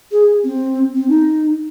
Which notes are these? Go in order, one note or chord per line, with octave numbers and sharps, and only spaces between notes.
G#4
C4
C4
D#4